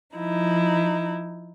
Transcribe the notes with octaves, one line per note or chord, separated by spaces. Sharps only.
F3 D#4 E4